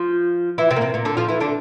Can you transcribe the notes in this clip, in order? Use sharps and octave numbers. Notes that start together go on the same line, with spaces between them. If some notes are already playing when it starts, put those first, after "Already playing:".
Already playing: F3 F4
E3 E4
C3 C4
A#3
C3 C4
A#2 A#3
D3 D4
F3 F4
E3 E4
D3 D4